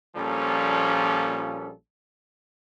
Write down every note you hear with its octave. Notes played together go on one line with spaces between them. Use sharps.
A#1 A#2 F3 G3 C#4 A4